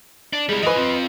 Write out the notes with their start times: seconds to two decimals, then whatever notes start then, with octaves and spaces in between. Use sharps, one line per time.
0.33 D4
0.49 G3 G#3 E4
0.62 E3 B4 D#5 G#5
0.75 C4 F4